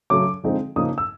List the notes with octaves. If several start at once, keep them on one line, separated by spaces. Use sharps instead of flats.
C#3 F#3 A3 D6
D3 F3 G#3 C4 D#4
C#3 F3 A#3 D#4 D#6
E6